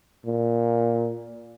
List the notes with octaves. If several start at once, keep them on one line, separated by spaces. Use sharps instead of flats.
A#2